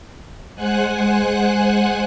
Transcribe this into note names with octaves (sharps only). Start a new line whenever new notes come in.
G#3 C5 F#5 G#5 F#6